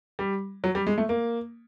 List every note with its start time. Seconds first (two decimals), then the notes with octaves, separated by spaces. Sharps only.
0.19 G3
0.64 F#3
0.75 G3
0.87 G#3
0.98 A3
1.09 A#3